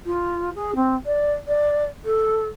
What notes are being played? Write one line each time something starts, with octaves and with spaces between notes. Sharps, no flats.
F4
G#4
C4
D5
D5
A4